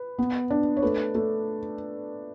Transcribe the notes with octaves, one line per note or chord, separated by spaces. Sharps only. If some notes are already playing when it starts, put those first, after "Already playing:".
Already playing: B4
B3
D4
C#5
A3 B4
A3